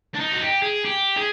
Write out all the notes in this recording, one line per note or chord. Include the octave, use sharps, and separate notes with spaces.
D4
D#4
F#4
G4
G#4
G4
G#4